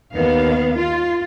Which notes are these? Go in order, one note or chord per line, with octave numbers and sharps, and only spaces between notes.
D#2 B3 F5
F4